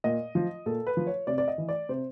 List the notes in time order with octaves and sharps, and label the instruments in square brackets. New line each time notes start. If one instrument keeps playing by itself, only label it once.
[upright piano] A#2 D#5
F3
A#2 A4
B4
F3
C#5
C3 D5
D5
D#5
E3
D5
C3 C5